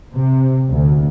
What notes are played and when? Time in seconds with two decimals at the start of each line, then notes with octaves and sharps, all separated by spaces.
0.14 C3
0.69 D2